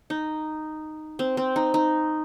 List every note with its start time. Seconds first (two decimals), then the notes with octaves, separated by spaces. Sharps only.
0.10 D#4
1.19 C4
1.37 C4
1.56 D#4
1.74 D#4